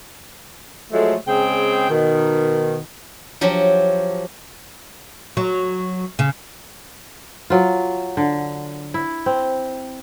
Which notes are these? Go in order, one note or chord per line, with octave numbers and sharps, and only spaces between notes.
F3 F#3 G#3 A3
C#3 G#3 C4 G#4 G5
B2 D#3
F3 F#3 G4
F#3
C#3
F#3 F4
D3
E4
C4